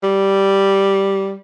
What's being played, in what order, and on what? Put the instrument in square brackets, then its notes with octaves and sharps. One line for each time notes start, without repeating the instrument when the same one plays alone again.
[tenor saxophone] G3